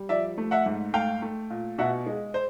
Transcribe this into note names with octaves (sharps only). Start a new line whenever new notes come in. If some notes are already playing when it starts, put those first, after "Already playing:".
Already playing: G3
F3 D5 E5
A3
E5 F#5
G#2
A3 F5 G5
A3
A#2
B2 E5 F#5
G#3
C5